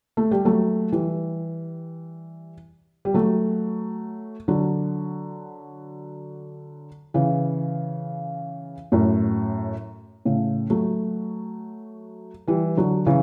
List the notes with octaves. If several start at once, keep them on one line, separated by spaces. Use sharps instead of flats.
A3
G3
F#3 A3
E3 G3
G3
F#3 A3
D3 F#3
C#3 E3
F#2 A2
A2 C#3
F#3 A3
E3 G3
D3 F#3
C#3 E3